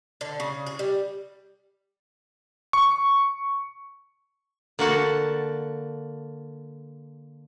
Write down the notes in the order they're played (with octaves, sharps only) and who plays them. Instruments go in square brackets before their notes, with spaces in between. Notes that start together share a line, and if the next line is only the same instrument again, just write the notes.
[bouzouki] D3
C#3
G#4
G3
[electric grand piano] C#6
[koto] D3 A#3 F#4 A5